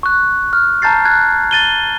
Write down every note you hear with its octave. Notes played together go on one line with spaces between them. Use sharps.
C#6 F#6
F6
A5 A#5 G6 A6 C7
F#6 G#6
A6 D#7 G7